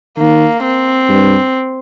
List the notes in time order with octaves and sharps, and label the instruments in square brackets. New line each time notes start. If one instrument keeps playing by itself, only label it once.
[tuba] D#3 [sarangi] A#3
[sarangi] C4
[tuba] G2